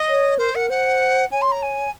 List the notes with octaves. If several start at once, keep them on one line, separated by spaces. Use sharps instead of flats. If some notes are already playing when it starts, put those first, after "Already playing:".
Already playing: D#5
C#5
A#4 C5
A#4 F#5
C5 F#5
C#5 G#5
C6
A#5
G#5